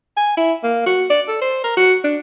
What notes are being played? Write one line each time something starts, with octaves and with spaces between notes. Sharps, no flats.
G#5
E4
A#3
F#4
D5
A4
C5
A#4
F#4
D4